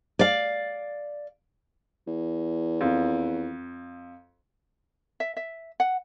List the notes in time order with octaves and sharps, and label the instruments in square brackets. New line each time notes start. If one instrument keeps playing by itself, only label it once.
[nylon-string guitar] D5 F5
[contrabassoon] E2
[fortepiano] F2
[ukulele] E5
E5
F#5